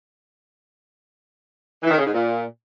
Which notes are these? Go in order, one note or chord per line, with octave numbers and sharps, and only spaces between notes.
E3
D#3
C#3
G#2
A#2